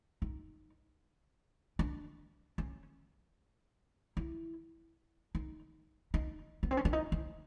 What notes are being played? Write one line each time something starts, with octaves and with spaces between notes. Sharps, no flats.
D#4
D4
C#4
E4
D#4
D#4
B3
C4
C#4
D4
D#4
E4